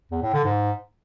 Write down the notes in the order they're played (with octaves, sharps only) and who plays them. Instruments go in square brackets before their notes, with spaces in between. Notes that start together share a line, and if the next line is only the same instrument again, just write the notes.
[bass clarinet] E2
A2
D3
G#2